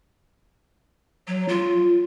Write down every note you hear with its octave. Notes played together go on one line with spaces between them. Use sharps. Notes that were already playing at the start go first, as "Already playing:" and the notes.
F#3
F4